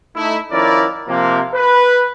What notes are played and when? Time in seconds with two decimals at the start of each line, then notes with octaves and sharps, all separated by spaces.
0.15 A3 D#4 E4
0.51 D#3 F3 C#4 E4 A#4 D5
1.08 C3 F3 A#3
1.53 B4